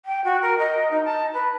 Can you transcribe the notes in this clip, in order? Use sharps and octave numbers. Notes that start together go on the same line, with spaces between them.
G5
F#4
A#4
D#5
D#4
A5
B4